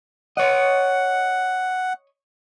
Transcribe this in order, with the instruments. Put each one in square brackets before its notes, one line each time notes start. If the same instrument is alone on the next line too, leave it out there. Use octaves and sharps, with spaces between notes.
[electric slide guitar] C#5 D#5 [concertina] F#5